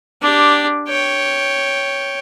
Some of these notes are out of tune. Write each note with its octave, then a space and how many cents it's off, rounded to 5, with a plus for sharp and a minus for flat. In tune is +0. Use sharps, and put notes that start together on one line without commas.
D4 +0 G4 +0
C#5 +0 G5 +0